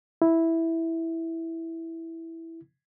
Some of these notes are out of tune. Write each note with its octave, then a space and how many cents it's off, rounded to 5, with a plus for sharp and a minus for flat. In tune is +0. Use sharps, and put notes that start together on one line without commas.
E4 -5